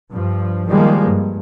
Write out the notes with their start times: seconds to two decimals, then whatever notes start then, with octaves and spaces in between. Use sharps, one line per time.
0.12 G2 F3
0.68 D#3 F3 G3 G#3 A#3
1.05 G2